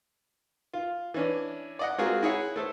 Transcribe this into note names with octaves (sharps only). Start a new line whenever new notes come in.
F4
E3 C#4 D4
D5 D#5 F#5
G#3 C4 F4 F#4 G#4 A#4
E4 G#4 C#5 F#5
A3 A4 C5